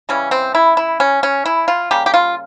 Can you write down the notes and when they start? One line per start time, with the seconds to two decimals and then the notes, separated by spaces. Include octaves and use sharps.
0.09 C#3 E3 G3 C#4
0.31 C4
0.55 E4
0.77 E4
1.00 C#4
1.23 C#4
1.45 E4
1.68 F4
1.91 C#3 G3 A#3 G4
2.06 G4
2.14 F4